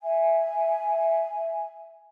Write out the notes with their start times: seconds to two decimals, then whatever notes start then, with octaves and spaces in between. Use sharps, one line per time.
0.03 E5 G#5